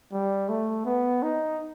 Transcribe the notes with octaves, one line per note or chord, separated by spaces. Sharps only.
G3
A3
B3
D#4